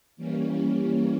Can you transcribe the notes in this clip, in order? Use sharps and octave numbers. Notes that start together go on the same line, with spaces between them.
E3 G3 A#3 C#4